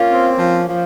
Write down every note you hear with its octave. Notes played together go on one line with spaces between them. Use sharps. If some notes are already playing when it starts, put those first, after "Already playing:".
Already playing: A#3 C#4 F4
C4
F3
F3